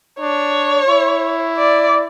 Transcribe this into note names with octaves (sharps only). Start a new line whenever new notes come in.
D4 C#5
E4
D5